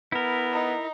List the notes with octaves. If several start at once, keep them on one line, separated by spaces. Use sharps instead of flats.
B3 E4 A#4
D#4